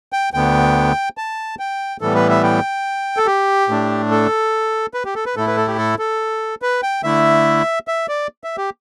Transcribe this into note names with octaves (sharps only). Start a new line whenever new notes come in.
G5
D2 D3 B3 G5
A5
G5
A2 E3 G3 B3 A4
B4
E5
G5
A4
G4
A2 A3 D4
A4
B4
G4
A4
B4
A2 A3 E4 A4
B4
A4
G4
A4
A4
B4
G5
D3 A3 E4 E5
E5
D5
E5
G4